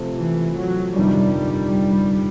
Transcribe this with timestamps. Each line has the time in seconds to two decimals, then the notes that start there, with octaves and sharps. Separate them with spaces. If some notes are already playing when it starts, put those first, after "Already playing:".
Already playing: C3 F3 A3 C4
0.15 E3
0.56 F#3
0.96 G1 F2 C3 D#3 G3